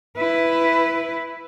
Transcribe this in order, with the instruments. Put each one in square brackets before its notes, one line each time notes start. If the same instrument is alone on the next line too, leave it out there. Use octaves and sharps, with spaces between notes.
[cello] E4 B4